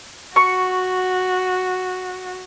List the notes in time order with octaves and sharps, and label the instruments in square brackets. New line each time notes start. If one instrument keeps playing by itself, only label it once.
[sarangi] F#4 [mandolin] C#6